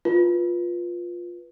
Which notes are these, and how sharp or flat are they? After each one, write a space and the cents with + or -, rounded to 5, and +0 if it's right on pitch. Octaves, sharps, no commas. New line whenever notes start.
F4 +5 B4 -15